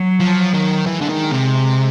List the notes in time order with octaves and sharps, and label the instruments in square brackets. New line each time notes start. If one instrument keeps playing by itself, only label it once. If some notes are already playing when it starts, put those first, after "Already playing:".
Already playing: [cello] F#3
[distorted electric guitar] F3
D#3
[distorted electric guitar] E3 [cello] G#3
[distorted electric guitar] D3
D#3
C3